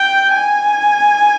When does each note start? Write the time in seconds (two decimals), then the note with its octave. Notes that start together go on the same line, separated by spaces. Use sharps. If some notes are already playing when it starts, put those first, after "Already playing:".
Already playing: G5
0.32 G#5